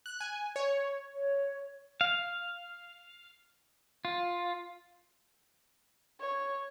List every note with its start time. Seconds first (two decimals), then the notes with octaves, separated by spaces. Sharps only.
0.06 F#6
0.20 G#5
0.56 C#5
1.13 C#5
2.01 F5
4.05 F4
6.20 C#5